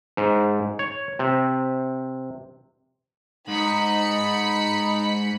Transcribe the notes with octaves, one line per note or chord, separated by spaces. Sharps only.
G#2
C#5
C3
G#2 D#4 B5 B6 C#7